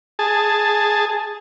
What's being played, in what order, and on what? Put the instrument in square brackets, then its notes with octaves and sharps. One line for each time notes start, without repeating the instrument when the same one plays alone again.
[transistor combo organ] G#4 A5